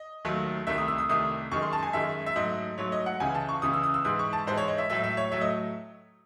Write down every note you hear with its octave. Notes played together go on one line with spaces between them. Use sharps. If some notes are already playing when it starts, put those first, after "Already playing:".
Already playing: D#5
D#2 D#3 F#3 A3
C2 C3 D#3 A3 E5
D#6
E6
D#6
C2 C3 D#3 A3 D#6
F#2 D#3 G#3 C#6
C6
A5
G#5
F#2 D#3 G#3 E5
E5
G#2 F#3 A3 D#5
G#2 F#3 A3 C#5
D#5
F#5
C#2 C#3 E3 G#5
A5
C#6
C#2 C#3 E3 D#6
E6
D#6
E6
G#2 E3 G#3 D#6
C#6
A5
G#2 E3 G#3 C5
C#5
D#5
E5
A2 F#3 A3 E5
E5
C#5
A2 F#3 A3 E5
D#5